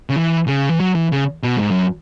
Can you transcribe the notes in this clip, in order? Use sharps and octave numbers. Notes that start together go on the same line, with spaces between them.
C#3
E3
C#3
E3
F#3
E3
C#3
B2
G#2
F#2